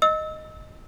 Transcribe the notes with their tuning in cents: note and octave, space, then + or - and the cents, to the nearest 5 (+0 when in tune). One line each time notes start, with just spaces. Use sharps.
D#5 +0 E6 -30